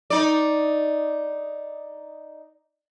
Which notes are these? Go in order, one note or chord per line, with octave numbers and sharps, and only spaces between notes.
D#4 D5